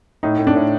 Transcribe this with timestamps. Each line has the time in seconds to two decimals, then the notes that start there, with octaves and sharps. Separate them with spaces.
0.23 A2 D#4
0.38 A2
0.47 D4
0.55 A2